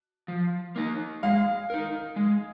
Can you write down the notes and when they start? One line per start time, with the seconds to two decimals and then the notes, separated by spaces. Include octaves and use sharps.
0.28 F3
0.76 A#3 D#4
1.23 G#3 F5
1.70 D#4 A#4
2.16 G#3